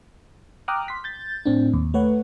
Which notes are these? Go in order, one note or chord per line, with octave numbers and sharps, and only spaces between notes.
G5 A#5 D6 D#6 F6 F#6
C6 B6
G6 A6
A2 C4 D4
D#2
A3 B4 C#5 F#5